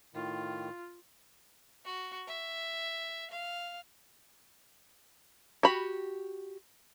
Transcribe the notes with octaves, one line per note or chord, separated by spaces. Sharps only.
A2 D#3 F4
F#4
E5
F5
F#4 G4 B5